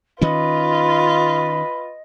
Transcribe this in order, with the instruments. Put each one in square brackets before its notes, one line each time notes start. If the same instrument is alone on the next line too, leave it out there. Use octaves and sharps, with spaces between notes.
[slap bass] D#3 C#4 [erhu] F4 [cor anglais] B4 [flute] D#5